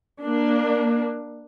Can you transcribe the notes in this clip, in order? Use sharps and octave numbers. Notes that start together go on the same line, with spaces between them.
A#3 D4